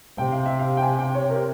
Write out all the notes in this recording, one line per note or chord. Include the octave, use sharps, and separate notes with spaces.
C3 G5
F5
E5
F5
G5
G#5
G5
C#5
A#4